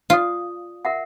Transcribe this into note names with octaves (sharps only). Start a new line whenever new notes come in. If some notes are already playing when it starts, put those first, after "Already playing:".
F4 D5 D#6
A#4 E5 F#5